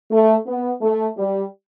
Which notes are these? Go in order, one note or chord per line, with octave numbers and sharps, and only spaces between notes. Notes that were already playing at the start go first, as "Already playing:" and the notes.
A3
B3
A3
G3